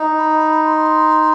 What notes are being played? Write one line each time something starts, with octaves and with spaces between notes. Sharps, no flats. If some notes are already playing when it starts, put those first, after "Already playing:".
Already playing: D#4
B5
C6